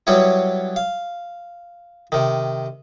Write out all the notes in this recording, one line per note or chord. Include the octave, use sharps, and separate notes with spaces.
F#3 G3 B3 C#4 E4
F5
C3 D#3